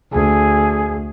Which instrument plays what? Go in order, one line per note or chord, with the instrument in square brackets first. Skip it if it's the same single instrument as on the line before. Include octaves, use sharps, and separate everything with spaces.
[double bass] D2 [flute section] G#4 G#5